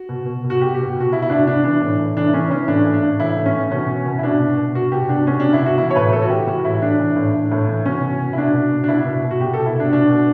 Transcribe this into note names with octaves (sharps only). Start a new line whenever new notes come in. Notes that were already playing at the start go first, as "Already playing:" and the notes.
Already playing: F#4
B2
B2
B2
F#4
B2 G4
G4
B2
B2 F#4
B2 E4
E4
B2 D4
B2 D4
E3 D4
A2
A2
E3 D4
E3 C#4
E3 C#4
A2 D4
A2
D4
A2
E3 E4
A2
C#4
E3
B2 C#4
B2
B2
E4
B2 D4
B2
B2
B2 F#4
B2 G4
B2 D4
B2 C#4
D4
B2
E4
B2 F#4
E3 E4
C#5
A2 B4
A2 A4
F#4
E3 G4
E3 F#4
A2 E4
A2 D4
E3
A2
A2
A2
E3
B2 C#4
B2
B2
E4
B2 D4
B2
B2
D4
B2 E4
B2
B2
F#4
B2 G4
A4
B2
E4
B2
D4
B2 D4
B2